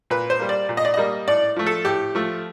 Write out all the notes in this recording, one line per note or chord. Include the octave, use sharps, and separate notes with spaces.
A#2 B4
C5
G3 A#3
D5
A#2
D#5
D5
G3 A#3 D#5
A2 D5
F3 A3
A4
A2 G4
F3 A3